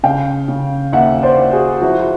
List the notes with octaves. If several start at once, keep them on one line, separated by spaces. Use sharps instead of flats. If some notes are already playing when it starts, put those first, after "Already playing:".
C#3 F5 G5
C#3
D#2 E5 F#5
C5 D5
D#2
F#4 G#4
F3 E4 F#4